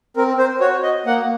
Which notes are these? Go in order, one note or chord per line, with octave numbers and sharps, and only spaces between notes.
C4 A#4
C5
F#4 C#5
D#5
A#3 F#5